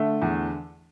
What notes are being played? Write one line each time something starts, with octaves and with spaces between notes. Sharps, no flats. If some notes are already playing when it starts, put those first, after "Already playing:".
Already playing: D3 A3
E2